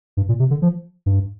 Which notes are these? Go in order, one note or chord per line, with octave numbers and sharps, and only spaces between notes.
G2
A#2
C3
D3
F3
G2